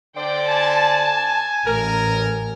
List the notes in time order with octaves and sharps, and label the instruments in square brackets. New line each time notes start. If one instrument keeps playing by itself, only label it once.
[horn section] D3 C5 D5 [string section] G5
[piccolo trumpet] G#5 [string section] A5
[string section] A1 [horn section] A#4